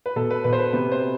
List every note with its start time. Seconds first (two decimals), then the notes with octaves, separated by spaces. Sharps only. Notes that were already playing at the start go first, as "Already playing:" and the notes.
0.06 B4
0.16 B2 A4
0.31 B4
0.44 B2 B4
0.53 C5
0.59 B4
0.73 C3 B4
0.92 C5